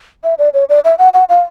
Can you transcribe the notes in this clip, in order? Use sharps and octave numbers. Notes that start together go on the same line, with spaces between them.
E5
D5
C#5
D5
E5
F#5
F#5
F5